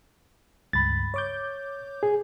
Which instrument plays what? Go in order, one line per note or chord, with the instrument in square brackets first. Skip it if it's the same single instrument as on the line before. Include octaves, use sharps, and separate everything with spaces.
[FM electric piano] C#2 G2 B5 [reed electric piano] A6
[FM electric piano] C#5 D6 G6
[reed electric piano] G#4